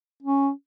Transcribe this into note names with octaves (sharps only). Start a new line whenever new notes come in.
C#4